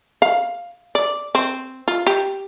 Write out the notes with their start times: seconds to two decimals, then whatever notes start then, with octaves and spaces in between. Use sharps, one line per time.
0.22 F5
0.95 D5
1.35 C4
1.88 F4
2.07 G4